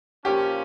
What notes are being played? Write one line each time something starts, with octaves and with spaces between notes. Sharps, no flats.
A#2 F3 A#3 C#4 G4